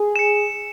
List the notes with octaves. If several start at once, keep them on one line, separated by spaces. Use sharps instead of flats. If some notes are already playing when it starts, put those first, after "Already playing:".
Already playing: G#4
C#7 E7